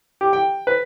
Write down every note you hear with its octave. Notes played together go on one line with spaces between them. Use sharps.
G4
G5
B4